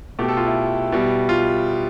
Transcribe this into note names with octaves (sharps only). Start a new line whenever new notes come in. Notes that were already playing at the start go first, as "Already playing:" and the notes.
B2 A3 G4
A4
F4
E4
B2 G3
F4